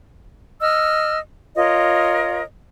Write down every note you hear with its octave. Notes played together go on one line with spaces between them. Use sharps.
D#5 E6 F6
F4 A#4 C#5 D#5